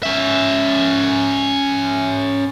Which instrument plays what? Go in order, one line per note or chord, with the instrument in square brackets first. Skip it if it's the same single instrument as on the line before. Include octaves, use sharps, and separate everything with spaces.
[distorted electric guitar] C#4 E5